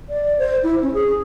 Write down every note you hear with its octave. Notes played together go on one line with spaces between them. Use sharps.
D5
C5
E4
C#4
G#4